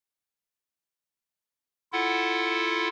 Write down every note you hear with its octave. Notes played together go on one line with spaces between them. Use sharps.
E4 F4 A4 F#5